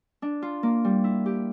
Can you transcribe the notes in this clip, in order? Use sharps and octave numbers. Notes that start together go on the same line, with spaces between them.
D4
F4
A#3
G3
E4
G4